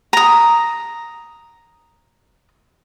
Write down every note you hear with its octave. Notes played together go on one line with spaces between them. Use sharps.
A#5 D#6